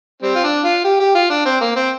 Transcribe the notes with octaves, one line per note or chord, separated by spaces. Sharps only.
G3 C4
F4
D4
F4
G4
G4
F4
D4
C4
A#3
C4